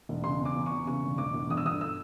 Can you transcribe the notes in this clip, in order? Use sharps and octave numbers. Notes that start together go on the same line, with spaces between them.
E1
C#3 C6
E2
D6
E2
C#6
E2
C#3 C#6
E1
E1 D6
E1
G1 D#6
E6
G1 D#6
E6